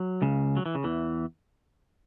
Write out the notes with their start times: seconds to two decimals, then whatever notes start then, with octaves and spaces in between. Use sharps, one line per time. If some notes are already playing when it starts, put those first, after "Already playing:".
Already playing: F#3
0.22 C#2 C#3
0.57 F#3
0.66 E3
0.75 C#3
0.84 E2 E3